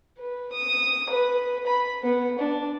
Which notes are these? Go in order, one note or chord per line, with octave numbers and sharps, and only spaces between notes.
B4
D#6
B4
B5
B3
D4